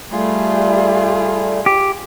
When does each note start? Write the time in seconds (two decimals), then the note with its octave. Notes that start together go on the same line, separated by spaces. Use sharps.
0.11 G3 A3 F4 G#4
1.66 G4